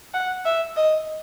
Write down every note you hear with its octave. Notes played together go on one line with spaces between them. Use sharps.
F#5
E5
D#5